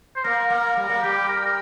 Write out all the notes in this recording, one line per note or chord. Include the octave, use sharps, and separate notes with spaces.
C5
A#3 A#4
A#3
G3
A#3
G3 G4
A#4
A#4